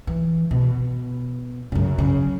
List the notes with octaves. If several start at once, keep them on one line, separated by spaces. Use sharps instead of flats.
E3
B2
F#2 C#3
C#3